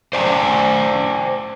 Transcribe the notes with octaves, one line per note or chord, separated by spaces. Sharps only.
C5 D5 G5 G#5 A#5